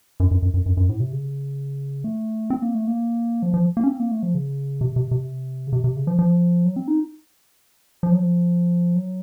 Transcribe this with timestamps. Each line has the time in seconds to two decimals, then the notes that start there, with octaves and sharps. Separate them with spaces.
0.20 F#2
0.31 F#2
0.42 F#2
0.54 F#2
0.66 F#2
0.77 F#2
0.89 A2
1.00 C3
1.12 C#3
2.04 A3
2.50 C4
2.62 A#3
2.75 A3
2.88 A#3
3.43 F3
3.54 F3
3.77 A#3
3.84 C#4
3.88 C4
4.00 A#3
4.12 A3
4.23 F3
4.35 C#3
4.81 C3
4.96 C3
5.11 C3
5.67 C#3
5.73 C3
5.84 C3
5.96 C#3
6.07 F3
6.19 F3
6.65 F#3
6.76 C4
6.88 D#4
8.03 F3
8.12 F#3
8.19 F3
8.95 F#3